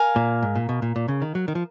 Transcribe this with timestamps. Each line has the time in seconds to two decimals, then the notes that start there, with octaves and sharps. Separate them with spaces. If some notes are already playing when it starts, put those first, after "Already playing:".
Already playing: A#4 F5 G#5
0.16 A#2
0.43 G#2
0.55 A#2
0.69 B2
0.82 A#2
0.96 A#2
1.08 C#3
1.22 D#3
1.35 F#3
1.48 D#3
1.55 F3